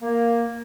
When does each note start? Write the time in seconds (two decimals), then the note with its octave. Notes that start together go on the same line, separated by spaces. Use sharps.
0.02 A#3